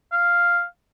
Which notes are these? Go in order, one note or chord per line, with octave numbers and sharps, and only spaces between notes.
F5